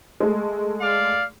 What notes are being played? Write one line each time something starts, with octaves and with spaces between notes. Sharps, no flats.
G#3 A3
D5 F5